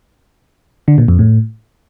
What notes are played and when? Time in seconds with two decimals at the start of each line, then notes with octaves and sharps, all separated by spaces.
0.88 D3
0.98 A#2
1.08 F2
1.19 A2